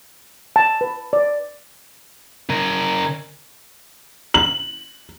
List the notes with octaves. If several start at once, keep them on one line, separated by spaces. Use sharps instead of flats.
A5
B4
D5
C#3 A#4
F#7